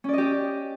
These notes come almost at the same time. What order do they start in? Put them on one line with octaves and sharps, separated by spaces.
C#4 D5 D#5 G4